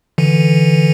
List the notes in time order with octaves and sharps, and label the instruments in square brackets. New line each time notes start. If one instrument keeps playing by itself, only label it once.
[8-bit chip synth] D3 E3